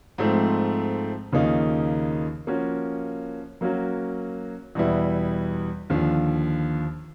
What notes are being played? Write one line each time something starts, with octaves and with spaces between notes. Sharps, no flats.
G#2 F3 A3 C4
D#2 C#3 F3 A#3 D#4
F3 A#3 C#4 F#4
F#3 A#3 C#4 F#4
E2 B2 G3 B3 E4
D#2 D3 F3